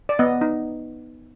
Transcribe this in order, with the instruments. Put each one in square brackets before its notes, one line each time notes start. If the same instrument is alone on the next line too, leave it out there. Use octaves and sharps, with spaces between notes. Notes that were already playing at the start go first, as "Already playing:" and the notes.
[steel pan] D5
B3 D#5
D#4